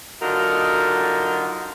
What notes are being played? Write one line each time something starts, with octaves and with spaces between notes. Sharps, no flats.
D3 F#3 D#4 F4 F#4 A#4